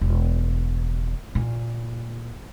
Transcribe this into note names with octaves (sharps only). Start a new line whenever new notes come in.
E1
A#2